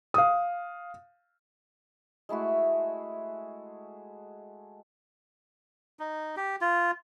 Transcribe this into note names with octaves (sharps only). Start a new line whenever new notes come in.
F5 D#6
G#3 A3 E4 F#4
D#4
G4
F4